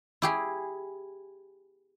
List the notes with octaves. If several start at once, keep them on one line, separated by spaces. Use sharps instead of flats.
E4 G4 G#4